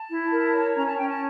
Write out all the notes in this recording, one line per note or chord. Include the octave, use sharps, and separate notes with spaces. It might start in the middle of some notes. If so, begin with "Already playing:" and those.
Already playing: A5
E4
A#4
C#5
C#4 A#5
A5
C#4 G5
A5